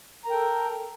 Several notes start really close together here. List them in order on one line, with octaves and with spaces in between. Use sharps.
A#5 A#4 G5 A4